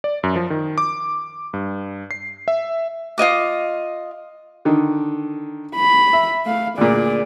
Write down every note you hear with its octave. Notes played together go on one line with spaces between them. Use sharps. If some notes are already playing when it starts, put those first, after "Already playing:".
D5
F#2
F3
D#3
D6
G2
C7
E5
F4 C#5 D#5 D6
D3 D#3
B5
E5
A3 F5
D2 A#2 G#4 D5